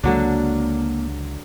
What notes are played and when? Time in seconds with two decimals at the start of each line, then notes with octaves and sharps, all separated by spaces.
0.03 C#2 D3 F#3 G#3 A#3 D4